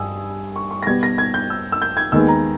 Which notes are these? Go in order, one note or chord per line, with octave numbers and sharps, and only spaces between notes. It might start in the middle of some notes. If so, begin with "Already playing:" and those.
Already playing: G2 G3 G#5 D#6 E6
C#6
C#6
A#6
B2 G3 B3 G#6
A#6
G#6
G6
E6
E6
G6
G#6
D#2 D#3 G#3 B3 E6
A#5